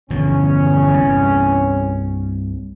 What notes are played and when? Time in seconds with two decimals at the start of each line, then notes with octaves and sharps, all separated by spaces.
0.10 G1 E2 B2 F3 C#4
0.94 C2 G2